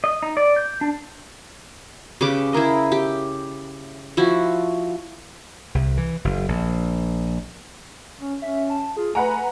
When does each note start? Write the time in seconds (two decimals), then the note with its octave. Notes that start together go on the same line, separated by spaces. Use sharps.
0.04 D#5
0.23 D#4
0.37 D5
0.56 G6
0.81 D4
2.21 C#3 G4 B4 D6
2.53 E4 G#4 A#4 D#5
2.92 G4
4.17 F3 E4 F#4
5.75 C2
5.97 E3
6.25 F#1
6.48 A#1
8.21 C#4
8.42 C#4 E5
8.70 A5
8.97 F4 G#4
9.15 A3 B4 F#5 G#5 A#5